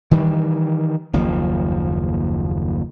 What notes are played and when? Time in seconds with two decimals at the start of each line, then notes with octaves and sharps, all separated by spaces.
0.11 D#3 E3 G3
1.13 F#1 D#2 F3